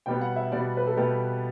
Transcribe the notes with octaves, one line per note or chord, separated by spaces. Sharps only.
B2 G3 B3 G5
F#5
E5
B2 G3 B3 D5
B4
A4
B2 G3 B3 G4